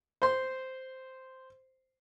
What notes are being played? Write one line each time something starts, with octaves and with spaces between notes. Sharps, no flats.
C5 C6